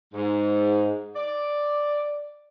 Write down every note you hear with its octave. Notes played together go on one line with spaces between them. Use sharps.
G#2
D5